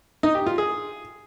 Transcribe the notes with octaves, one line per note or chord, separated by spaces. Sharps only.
D#4
G4
F4
G#4